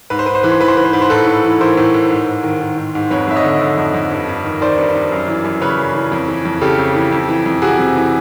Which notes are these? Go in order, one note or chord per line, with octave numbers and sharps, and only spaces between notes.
G#2 B4
C5
G#2 B4
C5
E3 B4
C5
E3 B4
C5
G#2 B4
C5
G#2 B4
C5
A2 A4 B4
A2
E3
E3 A#4 C5
A2
A2
G#2
G#2
D#3
D#3
G#2
G#2
F2 B4 C#5
F2 E5
C#5 D#5
D3
D3
F2
F2
G2
G2
D#3
D#3 C5 D5
G2
G2
F#2
E3
F#2
C#3 B4 C#5
F#2
E3
F2
E3
F2
C#3 G4 A4
F2
E3
F2
E3
F2
C3 F#4 G#4
F2
E3